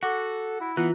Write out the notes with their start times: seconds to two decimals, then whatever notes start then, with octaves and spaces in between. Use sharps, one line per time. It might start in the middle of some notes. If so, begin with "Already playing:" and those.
0.03 F#4 A4 F#5 D6
0.61 E4
0.77 E3 B3 F4